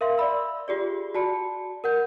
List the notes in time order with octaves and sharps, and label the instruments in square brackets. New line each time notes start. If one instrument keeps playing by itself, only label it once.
[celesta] A#4 E5 F5 C6
D5 E5 B5 E6
F4 G4 G#4 D5
F#4 D5 A5 B5 C#7
A#4 F#5 G6